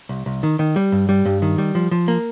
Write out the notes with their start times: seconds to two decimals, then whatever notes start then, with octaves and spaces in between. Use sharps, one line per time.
0.09 C2
0.26 C2
0.43 D#3
0.59 D#3
0.76 G3
0.92 G2
1.09 G3
1.25 G2
1.42 D#3
1.58 G3
1.75 F3
1.91 F3
2.08 A#3